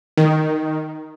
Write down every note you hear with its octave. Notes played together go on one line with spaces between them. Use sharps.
D#3